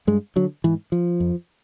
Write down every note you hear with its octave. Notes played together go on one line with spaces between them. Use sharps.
G2 G#3
D3 F#3
G#2 E3
F3
F2